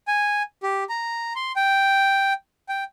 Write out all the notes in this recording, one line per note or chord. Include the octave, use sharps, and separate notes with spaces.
G#5
G4
A#5
C6
G5
G5